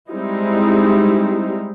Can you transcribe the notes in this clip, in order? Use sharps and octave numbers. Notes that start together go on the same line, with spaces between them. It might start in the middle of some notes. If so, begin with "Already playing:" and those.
G3 G#3 C4 D#4 E4